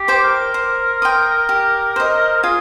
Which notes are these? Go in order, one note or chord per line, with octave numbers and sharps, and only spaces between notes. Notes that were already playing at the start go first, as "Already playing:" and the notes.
Already playing: G4
C5 G5 D6
A#4
C5
G5 C6 D#6
G4
C5 D#5
F4 G#4